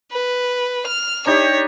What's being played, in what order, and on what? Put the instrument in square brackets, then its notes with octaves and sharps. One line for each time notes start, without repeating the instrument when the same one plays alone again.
[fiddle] B4
F6
[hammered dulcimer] D4 D#4 G4 [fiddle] C#5